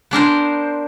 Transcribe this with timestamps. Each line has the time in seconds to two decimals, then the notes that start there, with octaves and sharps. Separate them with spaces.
0.11 B3 D4 A#4 C5